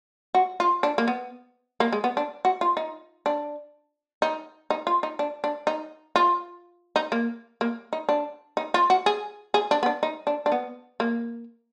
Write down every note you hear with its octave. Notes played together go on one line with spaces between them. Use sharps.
F#4
F4
D4
A#3
B3
A#3
G#3
B3
D4
F#4
F4
D#4
D4
D#4
D#4
F4
D#4
D4
D4
D#4
F4
D#4
A#3
A#3
D#4
D4
D#4
F4
F#4
G#4
G#4
D4
B3
D4
D#4
D4
D4
B3
A#3